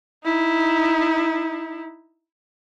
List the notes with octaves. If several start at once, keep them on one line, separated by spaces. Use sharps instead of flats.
D#4 E4